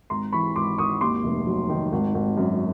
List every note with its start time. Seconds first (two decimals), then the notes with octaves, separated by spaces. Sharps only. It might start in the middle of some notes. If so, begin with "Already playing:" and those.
0.10 G#1 A#5 C6
0.33 E3 B5 C#6
0.56 G#1 C6 D6
0.78 G#1 C#6 D#6
1.01 D#2 C6 D6
1.24 F1
1.47 F#3
1.69 D#3
1.92 G#1
2.15 G#1
2.37 F#2